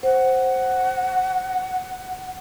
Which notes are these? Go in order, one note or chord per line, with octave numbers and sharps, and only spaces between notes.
C5 F#5